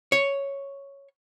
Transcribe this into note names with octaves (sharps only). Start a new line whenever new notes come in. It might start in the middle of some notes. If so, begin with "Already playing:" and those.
C#5